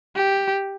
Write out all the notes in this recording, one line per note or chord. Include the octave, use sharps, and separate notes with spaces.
G4